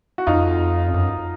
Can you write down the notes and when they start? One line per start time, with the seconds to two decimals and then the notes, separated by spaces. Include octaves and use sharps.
0.18 F#4
0.27 F2 D#4 F4
0.94 F#2